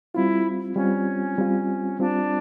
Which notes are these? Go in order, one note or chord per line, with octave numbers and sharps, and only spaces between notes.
G3 C4 E4 F4
G3 C4 C#4 F4
G3 C4 F4
G3 C4 D4 F4